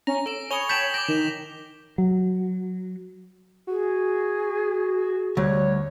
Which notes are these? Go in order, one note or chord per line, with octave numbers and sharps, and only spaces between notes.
C#4 A#5 A#6
A4 D7 E7
C#5 G#5 B5 D#6 F7 G7
G5 A5 G6 A6 B6 E7 F#7
D6 G6 A#6 D7
D#3 E7
F#3
F#4 G#4
D2 G3 C#5